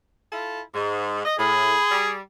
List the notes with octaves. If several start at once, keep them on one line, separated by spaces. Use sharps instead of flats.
E4 F4 A4
G#2
D#5
A2 G#4 B5
G3